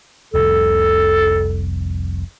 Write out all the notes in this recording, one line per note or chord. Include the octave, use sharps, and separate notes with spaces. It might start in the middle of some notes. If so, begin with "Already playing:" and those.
F1 C2 F2 A4